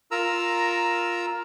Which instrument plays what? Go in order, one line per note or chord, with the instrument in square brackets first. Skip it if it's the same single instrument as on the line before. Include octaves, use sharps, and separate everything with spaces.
[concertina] F4 A#4 A#5 E6